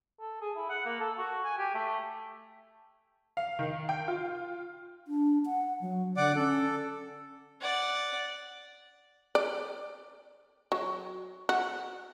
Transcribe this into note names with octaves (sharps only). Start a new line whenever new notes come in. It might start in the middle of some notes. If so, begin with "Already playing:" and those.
A4
G#4
E4
F#5
A#3
A4
F#4
G#5
G4
A3
F5
D#3
G5
F4
D4
F#5
F#3
D3 D5 F#5 D6
C#4 A4
D5 F#5
D5
F#3
F#4